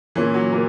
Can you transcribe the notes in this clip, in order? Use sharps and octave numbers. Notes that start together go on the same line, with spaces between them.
A#2 E3 A#3 C#4
F#3
A#2 E3 A#3